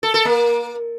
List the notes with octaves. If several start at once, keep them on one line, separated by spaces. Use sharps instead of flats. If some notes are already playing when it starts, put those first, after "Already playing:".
A4
A4
A#3